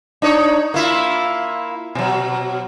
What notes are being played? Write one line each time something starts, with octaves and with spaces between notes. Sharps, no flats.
D4 D#4 C#5
A#3 E4 F4
B2 F#3